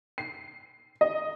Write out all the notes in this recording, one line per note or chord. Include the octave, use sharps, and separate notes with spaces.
C7
D#5